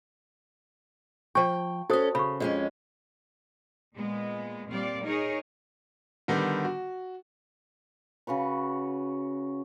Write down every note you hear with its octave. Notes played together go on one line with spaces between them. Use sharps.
F3 G5 C#6
C#4 F#4 A4 C5 D#6
C#3 B5 C#6
F2 G#3 C#4
A#2 G#3 B3
A#2 G3 C4 D5 F5
D#4 G#4 A#4 C#5
D3 D#3 G3 B3
F#4
C#3 F#4 B4 C#6